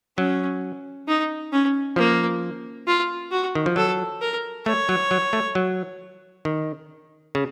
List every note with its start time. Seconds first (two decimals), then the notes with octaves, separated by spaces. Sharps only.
0.17 F#3 C#4
1.07 D#4
1.52 C#4
1.96 F3 A#3
2.87 F4
3.31 F#4
3.55 D#3
3.66 F3
3.76 F#3 A4
4.21 A#4
4.66 A3 C#5
4.89 F#3
5.11 F#3
5.33 A3
5.55 F#3
6.45 D#3
7.35 C#3